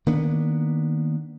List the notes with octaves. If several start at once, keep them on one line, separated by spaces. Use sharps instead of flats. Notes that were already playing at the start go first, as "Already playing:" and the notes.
D#3 A#3 B3 D4